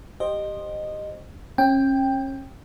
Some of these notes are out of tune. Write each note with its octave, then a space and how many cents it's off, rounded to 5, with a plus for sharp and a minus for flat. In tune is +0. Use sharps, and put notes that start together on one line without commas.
G4 +0 C5 +10 D#5 -15
C#4 -35 G5 +10